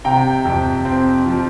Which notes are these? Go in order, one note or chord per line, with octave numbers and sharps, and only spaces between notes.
C3 G5 A#5
F2
C4
F3